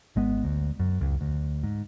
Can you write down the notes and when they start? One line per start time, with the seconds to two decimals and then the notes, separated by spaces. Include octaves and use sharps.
0.16 G#1 G#3 B3
0.44 D2
0.79 F#2
1.01 C#2
1.21 D2
1.63 G#2